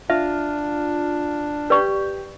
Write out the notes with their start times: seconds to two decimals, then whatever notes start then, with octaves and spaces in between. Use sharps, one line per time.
0.10 D4 F4 E5
1.70 G4 B4 D5 C#6